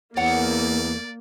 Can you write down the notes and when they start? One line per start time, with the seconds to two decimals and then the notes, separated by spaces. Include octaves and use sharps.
0.17 E2 A#3 C#5 D5 F#5